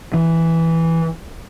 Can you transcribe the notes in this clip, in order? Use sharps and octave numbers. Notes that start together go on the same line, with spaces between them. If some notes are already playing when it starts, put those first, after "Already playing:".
E3